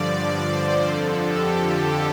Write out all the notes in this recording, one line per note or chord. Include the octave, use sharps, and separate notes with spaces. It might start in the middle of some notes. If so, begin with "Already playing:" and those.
Already playing: G2 D3 F3 D5
C5
F2 D3 F3 A4
G4
A4